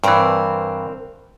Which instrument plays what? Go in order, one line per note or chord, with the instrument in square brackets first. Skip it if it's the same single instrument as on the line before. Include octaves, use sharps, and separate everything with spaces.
[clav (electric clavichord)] G2 E3 [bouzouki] C4 A#4